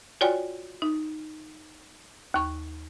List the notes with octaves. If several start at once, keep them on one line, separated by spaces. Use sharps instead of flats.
F4 F#4 C#5 D5 G5 G#5
D#4
D#2 C#6